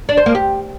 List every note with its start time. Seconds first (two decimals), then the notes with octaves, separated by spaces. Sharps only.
0.09 D4
0.17 C5
0.26 A#3
0.35 G4